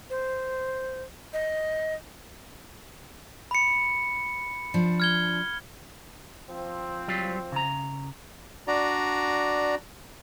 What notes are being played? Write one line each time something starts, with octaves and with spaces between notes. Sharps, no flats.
C5
D#5
B5 C#7
F3 D4
F6 G#6 G7
F3 C4
F#3 G3 F4
C#3 A#5
D4 F#4 D5 A#5